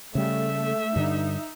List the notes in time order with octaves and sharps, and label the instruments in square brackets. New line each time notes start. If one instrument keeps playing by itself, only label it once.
[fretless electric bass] C#3 G3 [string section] A3 [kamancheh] E5
[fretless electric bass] G2 D3 [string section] D#4